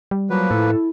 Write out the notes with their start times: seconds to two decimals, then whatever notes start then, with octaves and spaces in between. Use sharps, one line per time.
0.11 G3
0.30 F3 F#3 A#3 B4
0.51 A2 E4 A4